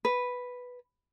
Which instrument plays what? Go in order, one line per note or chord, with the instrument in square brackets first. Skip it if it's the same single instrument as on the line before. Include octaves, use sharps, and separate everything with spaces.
[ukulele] B4